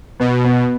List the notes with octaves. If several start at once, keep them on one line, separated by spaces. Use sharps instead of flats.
B2 B3
B3